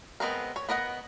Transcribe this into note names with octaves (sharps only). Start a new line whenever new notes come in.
G#3 B3 C4 A#4
C#5
B3 A#4 D#5 F#5